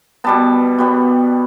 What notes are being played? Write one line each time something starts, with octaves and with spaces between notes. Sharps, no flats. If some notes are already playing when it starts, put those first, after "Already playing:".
B2 G3 B3 A5
B2 G3 B3